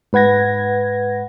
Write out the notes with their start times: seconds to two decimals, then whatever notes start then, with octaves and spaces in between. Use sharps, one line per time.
0.13 G#2 B4 F#5 G#6 A#6